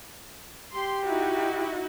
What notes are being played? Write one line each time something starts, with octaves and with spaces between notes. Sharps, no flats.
G4 C6
D#4 E4 F#4